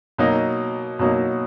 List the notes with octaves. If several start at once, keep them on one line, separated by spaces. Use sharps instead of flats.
B2 F#3 A#3 D#4
B2 F#3 A#3 D#4